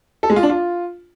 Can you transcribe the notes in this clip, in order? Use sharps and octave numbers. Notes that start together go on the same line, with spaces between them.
A4
G#3
F4
D4
F4